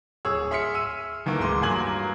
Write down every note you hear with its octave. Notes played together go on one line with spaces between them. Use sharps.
D1 G#4 C#5 E6
G#4 E5 C6 F6 B6 C#7
E6 D#7
D#3 E3 A3 A#3
D1 G#3 C6 D6
G2 F#3 A#3 G#5 G#6 F#7